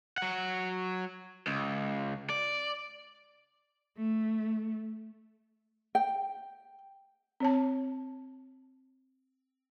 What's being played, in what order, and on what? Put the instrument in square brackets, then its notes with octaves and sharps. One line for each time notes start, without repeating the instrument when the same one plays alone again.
[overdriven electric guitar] F#3 F#5
C#2
D5
[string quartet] A3
[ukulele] G5
[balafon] C4 C#5 A5